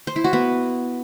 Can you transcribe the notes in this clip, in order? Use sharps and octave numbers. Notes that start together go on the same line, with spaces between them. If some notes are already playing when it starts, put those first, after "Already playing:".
C5
E4
F#4
B3